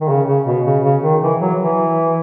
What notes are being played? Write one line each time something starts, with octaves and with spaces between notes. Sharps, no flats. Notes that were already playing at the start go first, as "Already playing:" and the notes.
D#3
C#3
C#3
B2
C#3
C#3
D#3
E3
F#3
E3